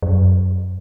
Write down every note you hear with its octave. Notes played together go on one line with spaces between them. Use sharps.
F#2